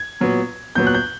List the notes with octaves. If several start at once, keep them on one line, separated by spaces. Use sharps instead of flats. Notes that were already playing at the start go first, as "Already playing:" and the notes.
Already playing: G#6
A#2 F#3 B3
A#2 F#3 B3 G6
F#6
G6